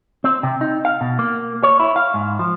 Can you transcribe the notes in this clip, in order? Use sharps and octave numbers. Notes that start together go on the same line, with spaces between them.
C4
C3
D#4
F5
B2
A#3
C#5
E4
F5
G#2
F3